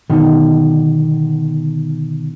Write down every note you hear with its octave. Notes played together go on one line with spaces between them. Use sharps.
B2 D3 D#3